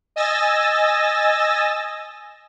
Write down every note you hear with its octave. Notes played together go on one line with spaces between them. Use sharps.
D#5 G#5 E6 A6 A#6